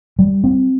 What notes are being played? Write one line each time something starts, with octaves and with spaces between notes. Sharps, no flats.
G3
C4